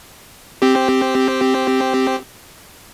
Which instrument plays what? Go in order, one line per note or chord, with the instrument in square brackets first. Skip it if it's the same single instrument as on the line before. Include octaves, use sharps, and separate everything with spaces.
[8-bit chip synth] C4 G4